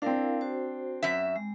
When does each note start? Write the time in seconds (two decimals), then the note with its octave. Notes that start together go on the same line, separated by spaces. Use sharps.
0.02 C4 D4 E4 A#4 F5
0.41 F#4 C5
1.03 F#2 E5
1.36 G#3